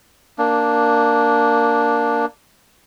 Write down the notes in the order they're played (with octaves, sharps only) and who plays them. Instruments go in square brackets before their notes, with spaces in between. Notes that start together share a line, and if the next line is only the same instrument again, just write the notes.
[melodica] A#3 D4